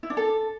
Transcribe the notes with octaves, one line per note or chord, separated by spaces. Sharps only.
E4
D4
A4